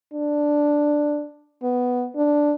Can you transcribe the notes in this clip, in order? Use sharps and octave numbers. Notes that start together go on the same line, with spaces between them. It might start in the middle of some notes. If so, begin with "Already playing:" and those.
D4
B3
D4